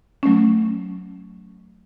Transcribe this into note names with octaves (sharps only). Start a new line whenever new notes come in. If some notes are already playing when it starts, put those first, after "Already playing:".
F#3 A3 C#4